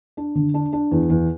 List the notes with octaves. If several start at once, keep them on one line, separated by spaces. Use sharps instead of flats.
D4
D3
D4
D4
E2
E2